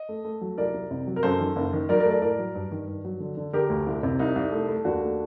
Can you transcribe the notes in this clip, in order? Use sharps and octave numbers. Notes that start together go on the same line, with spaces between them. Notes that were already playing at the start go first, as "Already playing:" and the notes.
Already playing: D#5
A3
A3
F#3
C2 A#4 D5
C2
C3
F#3
A#4
F#2 A4 C5
D#3
F#1
D#3
F#3 A#4 D5
A#4 D5
A3
A#4 D5
A2 A#4 D5
F#3
G2
D#3
G2
F#3
D3
D3
D3 G4 A#4
D2
C2
C3
C2 D#4
C2
A3
A3
D#2 D4 F#4
A3